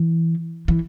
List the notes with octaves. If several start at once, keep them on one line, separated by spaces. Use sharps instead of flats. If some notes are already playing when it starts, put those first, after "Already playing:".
Already playing: E3
E3